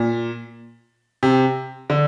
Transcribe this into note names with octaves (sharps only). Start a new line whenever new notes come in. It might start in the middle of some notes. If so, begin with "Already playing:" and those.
Already playing: A#2
C3
D3